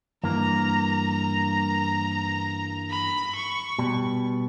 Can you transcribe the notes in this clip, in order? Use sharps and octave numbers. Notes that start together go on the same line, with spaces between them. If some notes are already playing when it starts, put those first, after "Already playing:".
G2 E3 A#3 A#5
A#5
B5
C#6
B2 G3